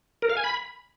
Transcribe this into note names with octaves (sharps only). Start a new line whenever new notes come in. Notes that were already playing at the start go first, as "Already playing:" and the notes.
A#4
F5
G#5
B5